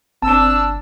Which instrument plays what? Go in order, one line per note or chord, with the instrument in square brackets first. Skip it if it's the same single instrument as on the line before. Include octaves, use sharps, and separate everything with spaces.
[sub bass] G1 [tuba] C4 [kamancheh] D4 E6 [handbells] A5